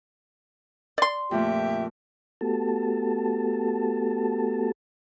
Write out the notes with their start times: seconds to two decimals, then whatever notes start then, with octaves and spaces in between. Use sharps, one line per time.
0.98 D5 C6
1.31 F2 A#2 A3 G4 E5
2.41 A3 B3 F#4 G4 A4 A5